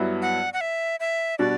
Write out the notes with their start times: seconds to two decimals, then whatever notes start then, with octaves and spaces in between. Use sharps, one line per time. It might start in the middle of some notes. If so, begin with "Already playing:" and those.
Already playing: G2 F#3 B3 E4
0.22 F#5
0.53 F#5
0.61 E5
1.00 E5
1.39 B2 G3 D4 F#4 D5